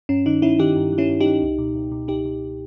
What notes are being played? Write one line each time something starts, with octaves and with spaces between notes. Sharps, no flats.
G2 C#4
D#3 D#4
G2 C#4 E4
D#3 D#4 G4
G2
D#3
C#4 E4
G2
D#4 G4
D#3
C#2
B2
C#2
B2
C#2 D#4 G4
B2